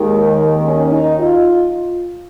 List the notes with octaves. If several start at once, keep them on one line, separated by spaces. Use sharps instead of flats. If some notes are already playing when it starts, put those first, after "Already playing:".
Already playing: D#2 D#3 G#3
C#4
D#4
F4